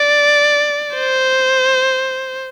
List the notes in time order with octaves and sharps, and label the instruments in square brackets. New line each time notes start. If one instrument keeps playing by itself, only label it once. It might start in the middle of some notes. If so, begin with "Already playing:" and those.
Already playing: [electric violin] D5
C5